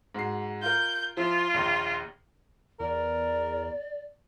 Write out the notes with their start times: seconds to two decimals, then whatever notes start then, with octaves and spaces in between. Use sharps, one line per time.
0.15 G#2 F#4 C7
0.62 F4 A#4 G6
1.17 F3 E4 F4
1.54 A#1 D#2
2.80 E2 A#4 D5